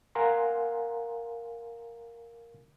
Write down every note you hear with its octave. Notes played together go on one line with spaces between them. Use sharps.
A#4 F5 F#5 G#5 A#5 C6